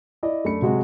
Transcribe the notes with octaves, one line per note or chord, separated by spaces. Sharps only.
E4 D5 D#5
F#2 A3 D4 B5 C#7
C3 F#3 G#3 F#4